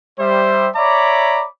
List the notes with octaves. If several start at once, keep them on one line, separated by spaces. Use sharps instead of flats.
G3 C5 E5
C#5 D5 E5 A#5 B5 D6